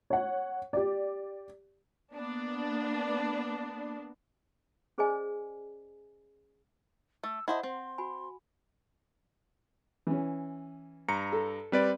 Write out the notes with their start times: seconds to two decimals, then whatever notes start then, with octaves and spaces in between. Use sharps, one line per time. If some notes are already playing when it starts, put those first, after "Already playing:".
0.10 C#5 F#5
0.73 G4 D5
2.14 A#3 B3 D4
4.98 C#4 G#4 C5 D5 D#5 G#5
7.24 A3 E6
7.48 E4 C5 D#5 F#5 A5
7.63 C4 C6
7.98 F#4 G#5 B5
10.07 E3 C#4
11.08 G2 A#5 C#7
11.32 A4
11.72 G3 C4 B4 D5